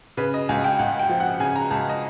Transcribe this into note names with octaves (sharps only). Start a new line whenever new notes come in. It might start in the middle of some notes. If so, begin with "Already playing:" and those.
C#3 B4
D#5
C#2 G#5
G5
C#2 F#5
G5
F3
F#5
C#3 G#5
A#5
C#2 A5
D#5